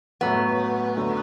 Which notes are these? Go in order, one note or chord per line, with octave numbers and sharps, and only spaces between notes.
A2 F#3 A3 B3
D3 F#3 A3